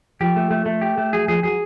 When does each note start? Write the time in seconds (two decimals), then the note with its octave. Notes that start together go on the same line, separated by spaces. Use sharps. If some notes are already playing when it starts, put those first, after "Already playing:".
0.20 F3 G4
0.36 A3
0.51 A3
0.66 A3
0.81 G4
0.98 A3
1.13 F#3 G#4
1.28 F3 G#4
1.43 F#3 G#4